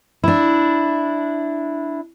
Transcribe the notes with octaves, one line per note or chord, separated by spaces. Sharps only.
D4 E4